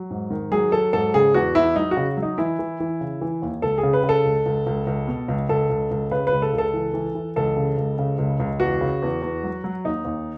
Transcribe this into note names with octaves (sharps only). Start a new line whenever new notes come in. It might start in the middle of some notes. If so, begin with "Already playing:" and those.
Already playing: F#3
G#2
D#3
F#3 G#4
F#3 A4
G#2 A4
C#3 G#4
E2 F#4
E2 E4
F#3 D#4
F#4
C#3
F#3
D#4
E3 E4
E3
E3
C#3
E3
D#2
C#2 A4
G#4
C#3
B4
C#3
A4
C#2
C#2
C#2
C#2
B2
C#2
C#2 A4
C#2
C#2
C#3 B4
C#2 B4
A4
C#2
A4
E3
E3
E3
C#2 A4
C#3
C#2
C#3
C#2
C#2
E2 F#4
C#3
E2
E2
F#3
F#3
D#2 D#4
D#2